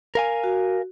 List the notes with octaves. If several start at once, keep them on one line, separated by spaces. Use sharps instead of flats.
A#4 F5 G#5
F#4